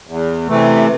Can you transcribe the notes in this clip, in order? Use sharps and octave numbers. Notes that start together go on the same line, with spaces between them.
E2
C3 E3 A3